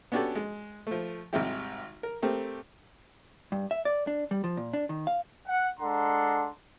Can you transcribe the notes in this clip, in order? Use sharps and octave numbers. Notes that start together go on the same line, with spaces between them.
B3 C#4 D4 F#4 G4 A4
G#3
F3 A3
G#1 C3 G3 G#3 E4 G4
A#4
A3 C4 G4 A#4
G2
E5
D5
D4
G3
F3
A#2
D4
D#3
F5
F#5
G#3 D4 A4 F#5 A#5 C6